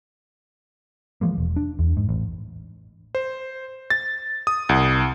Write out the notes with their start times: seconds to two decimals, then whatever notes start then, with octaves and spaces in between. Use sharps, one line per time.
1.21 E3 F3 G#3 A#3
1.38 E1
1.56 D4
1.79 E2
1.97 G#2
2.09 A1
3.15 C5
3.90 A6
4.47 D#6
4.69 C2